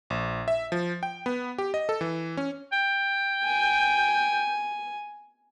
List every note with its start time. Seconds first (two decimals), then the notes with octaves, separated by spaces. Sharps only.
0.10 A#1
0.48 E5
0.72 F3
1.03 G5
1.26 B3
1.58 G4
1.74 D#5
1.89 A4
2.01 E3
2.37 C#4
2.73 G5
3.44 G#5